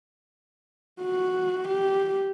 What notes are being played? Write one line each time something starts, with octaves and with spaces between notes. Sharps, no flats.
F#4
G4